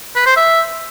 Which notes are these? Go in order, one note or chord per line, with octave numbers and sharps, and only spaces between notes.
B4
C5
E5